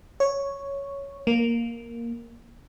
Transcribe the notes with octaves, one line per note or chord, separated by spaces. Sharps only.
C#5
A#3